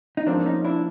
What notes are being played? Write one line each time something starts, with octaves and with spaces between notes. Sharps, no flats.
D#4
G#2 F3 A#3 C4 D4
C#4 D#4
D4 E4